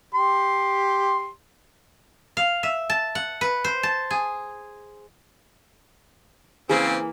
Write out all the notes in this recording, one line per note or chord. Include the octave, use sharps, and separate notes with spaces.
G4 C6
F5
E5
A5
F#5
B4
C5
A5
G#4
C#3 E3 A#3 C4 G#4